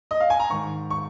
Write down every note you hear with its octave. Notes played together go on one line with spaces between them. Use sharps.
D#5
F5
G#5
A#5
G#2 D#3 C#6
C#6